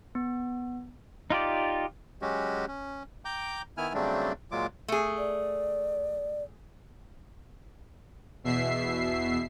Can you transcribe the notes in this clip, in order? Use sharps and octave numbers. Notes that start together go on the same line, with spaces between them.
B3
D#4 F4 G4 D5
F#3 G#3 C#4 F#4 G4
C#4
G5 A#5 D6 G6
D#3 B3 E4 G#5 F6
C#3 F#3 G3 A3 C4 D4
A#2 F#3 G#3 F4 D6
A3 G#4
D5
E2 B2 E5 C7